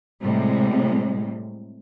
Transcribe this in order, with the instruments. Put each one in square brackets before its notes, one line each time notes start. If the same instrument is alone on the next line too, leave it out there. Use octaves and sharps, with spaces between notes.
[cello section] A2 C3 G3 G#3